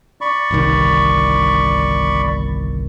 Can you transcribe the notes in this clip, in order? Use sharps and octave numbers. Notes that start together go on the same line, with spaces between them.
D5 B5 C#6
G1 C2 D#3